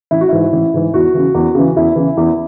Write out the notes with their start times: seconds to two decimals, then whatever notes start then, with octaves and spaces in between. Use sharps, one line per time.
0.11 A1 E4
0.21 F#4
0.29 G#2 E3 E4
0.53 A1
0.74 G#2 E3
0.94 E2 F#4
1.14 C#3 E3
1.35 E2
1.55 C#3 E3
1.76 E2 E4
1.96 C#3 E3
2.17 E2